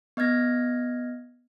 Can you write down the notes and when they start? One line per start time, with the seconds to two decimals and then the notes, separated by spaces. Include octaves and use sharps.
0.17 B3 D#5 F6 G#6 A#6